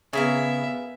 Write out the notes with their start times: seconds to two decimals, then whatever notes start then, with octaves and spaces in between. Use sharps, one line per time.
0.13 C#3 B3 G#4 A#4 E5 F5